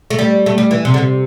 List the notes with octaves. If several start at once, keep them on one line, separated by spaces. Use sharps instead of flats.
A3
G3
A3
G3
E3
C3
D3
C3